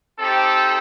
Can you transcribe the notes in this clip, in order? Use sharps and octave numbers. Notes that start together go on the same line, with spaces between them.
C4 D#4 G4 A4